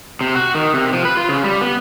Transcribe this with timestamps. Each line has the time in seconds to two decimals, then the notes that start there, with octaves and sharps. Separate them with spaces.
0.21 C3
0.35 F#4
0.55 D#3
0.74 C3
0.93 F3
1.05 B4
1.17 F4
1.29 C#3
1.44 G3
1.61 B3